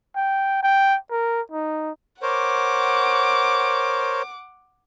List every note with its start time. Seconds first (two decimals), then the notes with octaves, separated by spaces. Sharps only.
0.16 G5
0.63 G5
1.11 A#4
1.52 D#4
2.22 A#4 C5 C#5 F#5 D6